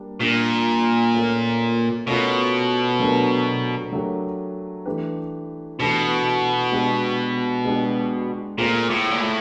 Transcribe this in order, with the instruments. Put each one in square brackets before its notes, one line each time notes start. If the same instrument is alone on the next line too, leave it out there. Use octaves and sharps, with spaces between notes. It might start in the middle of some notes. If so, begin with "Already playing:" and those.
Already playing: [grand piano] G3 A#3 D4
[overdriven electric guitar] A#2 [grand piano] G3 A#3 D4
[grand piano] A3 C#4 F4 A#4
[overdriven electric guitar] B2 [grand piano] A3 C#4 F4 A#4
[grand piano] F#3 A3 D4 G4 A#4
F#3 A3 D4 G4 A#4
E3 A3 D4 G4 B4
[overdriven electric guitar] B2 [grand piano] E3 A3 D4 G4 B4
[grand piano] G#3 B3 D4 G4
G#3 B3 D4 G4
[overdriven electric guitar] A#2 [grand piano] A3 C4 F4 G#4
[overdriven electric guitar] A2
A#2
A2